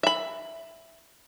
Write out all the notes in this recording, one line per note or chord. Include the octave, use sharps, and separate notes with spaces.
E5 B5